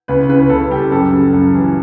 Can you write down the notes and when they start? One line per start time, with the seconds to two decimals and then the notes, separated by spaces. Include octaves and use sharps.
0.08 C#2 B4
0.29 C#3 B4
0.40 B4
0.49 C#2 A4
0.71 G3 G4
0.91 F#2 A4
1.13 C#3
1.33 F#2
1.54 E3